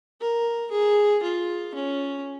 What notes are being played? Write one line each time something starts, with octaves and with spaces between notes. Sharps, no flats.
A#4
G#4
F4
C#4